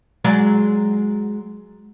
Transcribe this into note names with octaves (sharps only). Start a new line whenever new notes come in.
F#3 G#3 D5